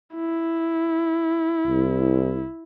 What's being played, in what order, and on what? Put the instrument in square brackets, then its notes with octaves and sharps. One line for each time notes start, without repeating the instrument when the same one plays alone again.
[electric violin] E4
[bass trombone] C2